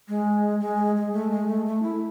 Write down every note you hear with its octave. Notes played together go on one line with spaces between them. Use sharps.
G#3
G#3
G#3
A3
G#3
A3
A3
E4